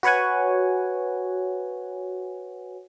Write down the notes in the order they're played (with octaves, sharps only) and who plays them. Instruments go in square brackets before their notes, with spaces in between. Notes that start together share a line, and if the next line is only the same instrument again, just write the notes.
[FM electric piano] F#4 B4 C#5 F#5 G#5